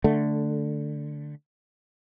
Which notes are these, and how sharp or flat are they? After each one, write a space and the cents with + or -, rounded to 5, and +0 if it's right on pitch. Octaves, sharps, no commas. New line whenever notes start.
D3 +0 A3 +0